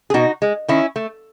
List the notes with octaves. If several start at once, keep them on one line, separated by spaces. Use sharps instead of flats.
G#4
B2 D#4 F#4
G#3
D#3 C#4 E4
A3